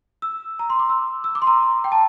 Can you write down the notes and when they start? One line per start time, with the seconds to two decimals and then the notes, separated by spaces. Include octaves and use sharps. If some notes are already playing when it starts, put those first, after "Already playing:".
0.22 E6
0.59 A#5
0.70 C6
0.79 D6
0.89 E6
1.24 E6
1.35 D6
1.42 C6
1.47 A#5
1.84 G5
1.92 A5